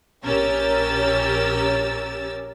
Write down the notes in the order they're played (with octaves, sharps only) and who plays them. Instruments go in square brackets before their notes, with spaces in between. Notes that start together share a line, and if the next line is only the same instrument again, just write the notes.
[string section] A#1 C#4 G4 A#4 E6 A6